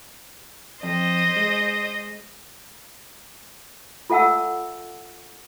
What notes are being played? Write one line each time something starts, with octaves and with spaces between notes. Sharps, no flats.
F2 C5 D#5
G#3
F4 A4 E5 F#5 A5 E6